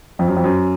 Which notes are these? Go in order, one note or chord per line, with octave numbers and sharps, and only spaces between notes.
F2
F#2
F2
F#2